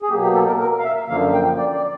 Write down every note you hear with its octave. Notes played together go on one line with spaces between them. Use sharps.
G#4
B2 F#3 A#3 G4
G4
A4
A#4
A#4
F5
E5
F#2 D3 F3 A#3 F5
G5
D5
D5